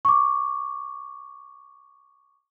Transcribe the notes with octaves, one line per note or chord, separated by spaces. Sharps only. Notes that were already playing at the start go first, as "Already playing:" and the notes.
C#6 D6